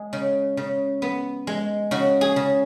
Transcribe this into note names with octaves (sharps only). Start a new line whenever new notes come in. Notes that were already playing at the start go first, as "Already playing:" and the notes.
Already playing: G#3 G#4
C#3
C#3
B3
G#3
C#3 F#4
G#4
C#3